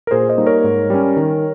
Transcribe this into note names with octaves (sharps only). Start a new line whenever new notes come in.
A#4
A#2 G#4 C5
C5 D#5
G3 A#3 D#4
A#4 C#5
G#2
G3 C#4
D#3